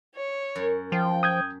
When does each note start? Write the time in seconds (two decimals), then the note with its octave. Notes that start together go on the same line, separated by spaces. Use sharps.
0.15 C#5
0.56 F#2
0.92 F3 G5
1.23 D#6 G6 G#6